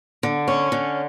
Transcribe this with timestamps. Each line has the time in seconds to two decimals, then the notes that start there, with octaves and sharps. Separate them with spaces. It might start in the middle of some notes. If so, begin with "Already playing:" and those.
0.23 D3
0.48 C#4
0.72 D3